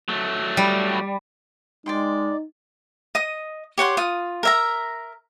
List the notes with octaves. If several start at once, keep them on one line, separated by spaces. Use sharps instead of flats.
F#3 A3
G3
G#3 D#4 D5 G5 C6
D#5 D#6
G4 C#5 F#5 C6
F4 D#6
A#4 E5 A#5